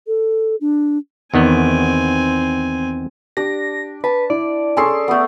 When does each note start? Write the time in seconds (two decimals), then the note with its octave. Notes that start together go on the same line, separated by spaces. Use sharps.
0.07 A4
0.61 D4
1.34 E2 D#3 B3 C4 G#5
3.37 D4 G4 A#6
4.04 B4 A5
4.30 E4 D5
4.77 C#4 G#4 A4 G#5 C6 C7
5.08 A3 B3